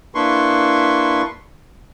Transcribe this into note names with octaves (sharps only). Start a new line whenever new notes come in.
A#3 D4 E4 B4 C6 C#6